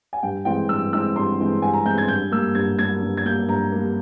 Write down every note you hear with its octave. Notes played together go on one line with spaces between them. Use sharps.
G#5
G2 G5
E3 G#3 C4 G5
G2 E6
E3 G#3 C4 E6
G2 C6
E3 G#3 C4
G2 G#5
A#5
E3 G#3 C4 G6
G#6
G2 G6
G3 A#3 E6
G2 G#6
G3 A#3 G#6
G2
G#6
G3 A#3 G6
G2 A#5
G3 A#3